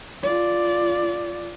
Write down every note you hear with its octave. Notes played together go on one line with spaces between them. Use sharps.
F4 D5